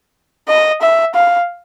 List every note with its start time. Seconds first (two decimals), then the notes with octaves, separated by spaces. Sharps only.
0.48 D#5
0.82 E5
1.15 F5